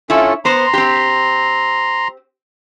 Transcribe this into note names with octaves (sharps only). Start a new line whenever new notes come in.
C#4 E4 F4 A4 C#5
B3 C5 A#5 C6
C4 G4